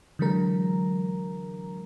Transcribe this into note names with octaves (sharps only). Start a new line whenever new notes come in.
D3 E3 F#3 G#3 A#4 A#5